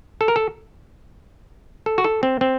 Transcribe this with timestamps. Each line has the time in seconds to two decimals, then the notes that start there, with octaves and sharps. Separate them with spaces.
0.21 A4
0.28 A#4
0.36 A4
1.86 A4
1.98 F#4
2.04 A4
2.23 C4
2.41 C4